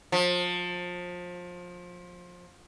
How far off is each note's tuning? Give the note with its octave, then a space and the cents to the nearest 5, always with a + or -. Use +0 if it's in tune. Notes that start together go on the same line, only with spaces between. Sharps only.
F3 +25